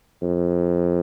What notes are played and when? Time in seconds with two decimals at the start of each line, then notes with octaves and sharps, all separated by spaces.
0.22 F2